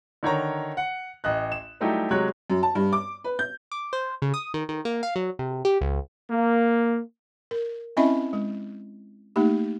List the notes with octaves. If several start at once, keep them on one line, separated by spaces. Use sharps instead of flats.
D3 D#3 C#5 A#5
F#5
A1 D#5 F#6
E7
F#3 G3 A3 D#4 E4 G4
C3 F#3 G#3 C#5 F#6
F#2
A5
G2
D6
B4
G6
D6
C5
C#3
D#6
D#3
D#3
A#3
F5
F#3
C3
G4
C#2
A#3
A#4
C4 C#4 E4 D#5 E5 B5
G#3
A3 A#3 D#4 G4